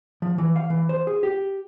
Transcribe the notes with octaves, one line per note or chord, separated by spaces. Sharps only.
F3
E3
F5
E3
C5
G#4
G4